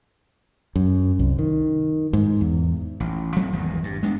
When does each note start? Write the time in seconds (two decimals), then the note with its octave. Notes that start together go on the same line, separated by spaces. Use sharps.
0.76 F#2
1.19 C2
1.39 D#3
2.13 G#2
2.41 E2
3.00 A1
3.36 F3 F#3 A3 C4
3.52 G#1 E2 B2
3.84 G2
4.03 G#3 B3 C#4 D4